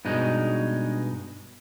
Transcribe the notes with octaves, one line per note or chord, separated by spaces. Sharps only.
G2 B2 G#3 D#4